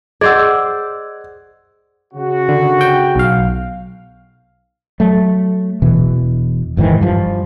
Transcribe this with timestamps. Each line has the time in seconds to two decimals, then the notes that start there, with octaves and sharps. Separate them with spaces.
0.21 G#4 C5 D5 D#5 F#5 E6 G#6
2.14 C#3 F#4
2.49 D3
2.81 G5
3.15 B1 F5
5.00 F#3 A3
5.82 E1 B2 E3
6.77 F#1 G#2 D#3 E3
7.01 G2 F3